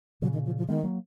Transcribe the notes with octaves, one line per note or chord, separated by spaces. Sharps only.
A#2 C#3 F#3
D#3
F3
F3
D#3 G#3 B3
F#3 A#3